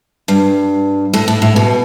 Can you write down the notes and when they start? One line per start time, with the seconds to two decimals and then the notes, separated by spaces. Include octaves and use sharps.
0.28 G2
1.13 A2
1.28 A2
1.42 A2
1.56 B2